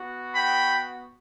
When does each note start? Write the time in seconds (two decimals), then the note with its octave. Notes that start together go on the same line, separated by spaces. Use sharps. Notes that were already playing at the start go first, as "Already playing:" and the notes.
Already playing: B3 F#4
0.35 G5 B5